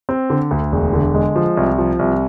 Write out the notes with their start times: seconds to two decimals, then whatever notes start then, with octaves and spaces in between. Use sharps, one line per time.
0.09 C4
0.30 D3
0.51 D2
0.72 E1
0.93 D3
1.15 G#3
1.36 F3
1.57 C2
1.78 F3
1.99 C2